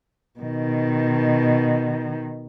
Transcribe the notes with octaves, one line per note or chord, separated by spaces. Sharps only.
B2 D#3